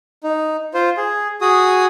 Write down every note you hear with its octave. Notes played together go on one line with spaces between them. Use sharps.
D#4
F4 C5
G#4
F#4 G#4 D#6